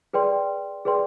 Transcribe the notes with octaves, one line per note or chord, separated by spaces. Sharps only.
G#4 B4 D5 G5 C6
G#4 B4 D5 G5 C6